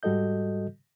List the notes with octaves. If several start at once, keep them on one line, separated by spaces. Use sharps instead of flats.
G#2 G3 F#4 A4 D#5 G6